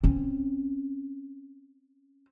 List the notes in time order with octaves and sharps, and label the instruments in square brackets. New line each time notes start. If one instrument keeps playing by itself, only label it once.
[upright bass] C4 C#4